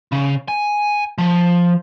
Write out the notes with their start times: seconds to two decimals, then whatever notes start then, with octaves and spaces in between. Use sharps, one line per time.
0.12 C#3
0.48 G#5
1.18 F3